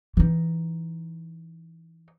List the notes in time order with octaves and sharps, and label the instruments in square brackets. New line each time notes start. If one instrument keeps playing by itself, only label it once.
[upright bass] E3 D#4